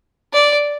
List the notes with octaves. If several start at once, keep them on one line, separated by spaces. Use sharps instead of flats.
D5